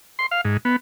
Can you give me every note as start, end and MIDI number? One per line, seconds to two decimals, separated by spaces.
0.19 0.26 84
0.31 0.41 77
0.45 0.57 44
0.65 0.76 59